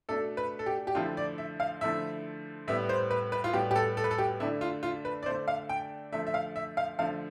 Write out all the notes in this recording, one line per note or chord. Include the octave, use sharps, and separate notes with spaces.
B2 A3 D4 A4
B4
A4
G4
G4
D3 F3 A3 E4 F4
D5
E5
F5
D3 F3 A3 E4 E5
A2 G3 B3 E5
C5
B4
B4
F4
A2 G3 B3 G4
G4
A4
A4
B4
A4
G4
D3 A3 D4 E4
F4
F4
B4
D5
D3 A3 D4 C5
F5
G5
D3 F3 A3 E5
E5
F5
E5
F5
D3 F3 A3 F5